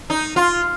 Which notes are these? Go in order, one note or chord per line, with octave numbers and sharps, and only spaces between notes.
D#4
F4